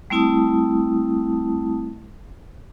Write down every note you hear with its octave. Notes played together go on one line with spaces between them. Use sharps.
G3 A3 C4 E4 A5 D#6